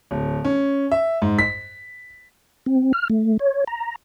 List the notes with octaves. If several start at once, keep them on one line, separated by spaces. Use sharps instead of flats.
D1
C#4
E5
G#2
B6
C4
F6
A3
C#5
A#5